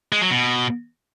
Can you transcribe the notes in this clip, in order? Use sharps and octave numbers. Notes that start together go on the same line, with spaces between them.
G#3
F#3
B2